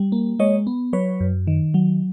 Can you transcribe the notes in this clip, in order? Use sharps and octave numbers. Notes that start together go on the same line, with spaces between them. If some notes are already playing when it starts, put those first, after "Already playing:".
Already playing: G3
A#3
G#3 C#5 D#5
B3
F#3 B4 C#5
F#2
D#3
F#3